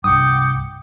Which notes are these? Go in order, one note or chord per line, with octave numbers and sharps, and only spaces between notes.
C2 G2 F#5 G5 D6 D#6